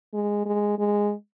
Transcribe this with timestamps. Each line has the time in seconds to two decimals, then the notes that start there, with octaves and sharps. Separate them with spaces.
0.14 G#3
0.46 G#3
0.79 G#3